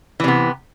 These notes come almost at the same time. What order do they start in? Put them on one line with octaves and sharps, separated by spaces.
E3 C3 B3